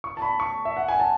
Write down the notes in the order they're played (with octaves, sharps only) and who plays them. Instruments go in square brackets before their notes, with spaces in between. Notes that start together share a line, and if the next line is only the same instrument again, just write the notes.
[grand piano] C#6
A5
B5
C#6
E5
F#5
G#5
A5